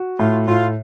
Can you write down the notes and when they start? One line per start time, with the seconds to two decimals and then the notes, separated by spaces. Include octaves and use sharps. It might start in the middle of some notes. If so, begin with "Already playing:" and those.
Already playing: F#4
0.19 A2 F4
0.47 A2 F4